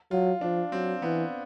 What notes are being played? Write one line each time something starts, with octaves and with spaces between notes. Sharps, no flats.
F#3 F4
F3 D4
F#3 C4
E3 B3